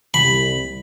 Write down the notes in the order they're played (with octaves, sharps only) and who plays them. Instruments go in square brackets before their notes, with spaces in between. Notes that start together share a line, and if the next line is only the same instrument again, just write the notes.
[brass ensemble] C2 [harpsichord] B5